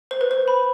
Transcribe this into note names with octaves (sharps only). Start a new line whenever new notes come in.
C5
B4
C5
B5